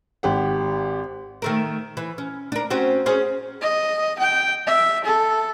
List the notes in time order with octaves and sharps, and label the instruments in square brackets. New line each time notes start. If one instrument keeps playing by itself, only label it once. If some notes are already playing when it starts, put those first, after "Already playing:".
[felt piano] G#1 G4 F#5
[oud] D#3 A3 A#4
E3
C#4
D4 A#4
C4 C#4 F#4
C#4 G#4 C5
[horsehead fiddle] D#5
G5
E5
A4